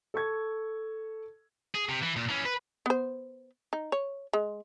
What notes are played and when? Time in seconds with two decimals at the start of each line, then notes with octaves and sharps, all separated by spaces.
0.14 A4 C#6 G#6
1.74 G#4
1.89 C3
2.02 E3
2.16 A#2
2.29 E3 C#4
2.46 B4
2.86 B3 C5
3.73 D#4
3.92 C#5
4.33 G#3